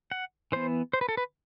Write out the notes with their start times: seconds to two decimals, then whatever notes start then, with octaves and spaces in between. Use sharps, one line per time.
0.11 F#5
0.52 E3 B3 C5
0.93 C5
1.01 B4
1.09 A4
1.17 B4